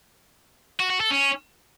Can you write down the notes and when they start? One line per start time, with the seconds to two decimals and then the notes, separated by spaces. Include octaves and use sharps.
0.80 F#4
0.90 F#4
1.00 A4
1.11 C#4